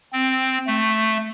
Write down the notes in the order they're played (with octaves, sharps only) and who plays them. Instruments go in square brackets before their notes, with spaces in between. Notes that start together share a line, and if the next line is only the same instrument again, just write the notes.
[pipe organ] C4
A3